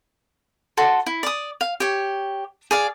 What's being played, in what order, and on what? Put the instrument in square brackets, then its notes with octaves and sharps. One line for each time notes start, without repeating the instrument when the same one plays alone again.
[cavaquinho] F#4 A4 C6
E4
D5 D#6
F5
G4 C#5
G#4 D5 F5